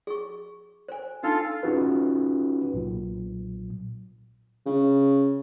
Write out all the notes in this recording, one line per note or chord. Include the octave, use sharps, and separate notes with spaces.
G#4 C#6
C5 G#5
D4 D#4 F4 A4 F5
C#4 D#4 F4 F#4 G#4 B4
B1 A#2 F#3
C#3